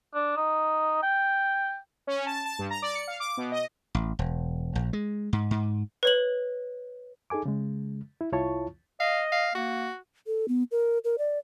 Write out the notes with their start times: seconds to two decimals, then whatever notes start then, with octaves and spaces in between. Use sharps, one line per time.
0.14 D4
0.37 D#4
1.03 G5
2.07 C#4
2.26 A5
2.45 A5
2.59 G2
2.70 A#5
2.82 D5
2.95 C#7
3.08 F5
3.20 D6
3.37 B2
3.52 D#5
3.95 A1
4.19 E1
4.75 A#1
4.93 G#3
5.33 G#2
5.51 G#2
6.03 B4 C#5 F#7
7.30 D#4 G#4 A4 G#5 D6
7.46 C#3 G#3
8.21 E4
8.32 C2 E4 F4 C#5 A5 C#6
9.00 D#5 F5
9.32 F5
9.55 A#3 F#4
10.27 A4
10.48 B3
10.71 A#4
11.04 A#4
11.18 D5